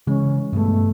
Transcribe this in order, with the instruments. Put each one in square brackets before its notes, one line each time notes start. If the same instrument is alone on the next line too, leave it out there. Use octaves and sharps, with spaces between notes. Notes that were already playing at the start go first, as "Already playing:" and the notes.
[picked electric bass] C#3 [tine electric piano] E3 G#3 [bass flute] C#4
[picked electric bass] G2 B2 [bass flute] A3